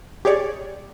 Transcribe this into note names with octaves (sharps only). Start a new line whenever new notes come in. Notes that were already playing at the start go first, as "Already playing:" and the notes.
G4 G#4 C#5 D5